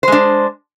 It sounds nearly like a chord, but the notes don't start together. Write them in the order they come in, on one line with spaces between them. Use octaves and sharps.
C5 G#3 D4